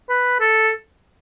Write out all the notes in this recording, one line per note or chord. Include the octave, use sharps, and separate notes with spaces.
B4
A4